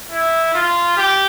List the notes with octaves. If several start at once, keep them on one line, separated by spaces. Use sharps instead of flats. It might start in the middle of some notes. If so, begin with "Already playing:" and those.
E4
F4
G4